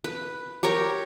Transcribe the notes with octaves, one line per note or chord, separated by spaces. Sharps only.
B4
G4 A#4 C#5 A#5